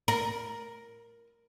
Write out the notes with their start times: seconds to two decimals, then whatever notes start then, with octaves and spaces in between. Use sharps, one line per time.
0.08 A#4